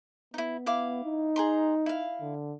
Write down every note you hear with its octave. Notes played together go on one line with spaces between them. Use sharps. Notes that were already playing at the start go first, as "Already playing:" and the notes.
B3 D#4 E4
E4 F5 D6
D#4
G#4 A#5 C6
E4 F5
D3